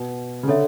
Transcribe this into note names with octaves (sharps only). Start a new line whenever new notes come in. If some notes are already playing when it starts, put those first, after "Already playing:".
Already playing: B2
C#3
D3 A4 C#5 E5